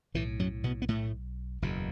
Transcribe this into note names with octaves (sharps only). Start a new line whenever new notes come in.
B1 A2 E3
F#2 F#3
B2 B3
B3
A2 A3
F#1 E2 B2